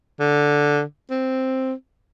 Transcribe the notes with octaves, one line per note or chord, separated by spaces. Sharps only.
D3
C4